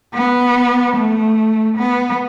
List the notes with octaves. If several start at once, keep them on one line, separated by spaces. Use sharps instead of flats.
B3
A3
B3